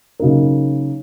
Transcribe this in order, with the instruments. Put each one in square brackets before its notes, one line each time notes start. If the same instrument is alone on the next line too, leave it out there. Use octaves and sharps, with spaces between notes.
[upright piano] C#3 F#3 A#3 D#4 A#4